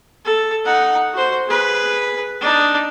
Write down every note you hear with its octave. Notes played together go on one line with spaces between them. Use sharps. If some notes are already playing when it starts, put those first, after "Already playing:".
A4
D#4 F#5
F#4 C5
G#4 B4
D4 D#4